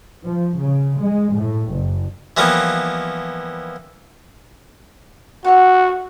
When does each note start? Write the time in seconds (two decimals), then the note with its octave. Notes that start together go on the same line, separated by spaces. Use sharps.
0.25 F3
0.58 C#3
1.00 G#3
1.33 A2
1.69 F#1
2.37 E3 F3 G3 A#3 B3
5.44 F#4 C#5 E5 F#5